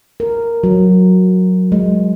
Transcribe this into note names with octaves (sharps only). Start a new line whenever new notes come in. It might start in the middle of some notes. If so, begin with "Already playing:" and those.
A#4
F#3
G#3